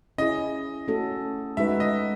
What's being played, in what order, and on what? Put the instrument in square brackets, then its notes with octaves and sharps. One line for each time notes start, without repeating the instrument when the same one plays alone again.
[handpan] C#4 E4 G#4 [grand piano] D#5
[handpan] A3 C#4 F#4 A4
[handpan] G#3 D#4 F#4 B4 [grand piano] E5
[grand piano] D#5